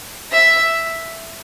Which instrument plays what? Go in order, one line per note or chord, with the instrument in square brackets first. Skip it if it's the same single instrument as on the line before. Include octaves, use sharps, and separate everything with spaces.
[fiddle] E5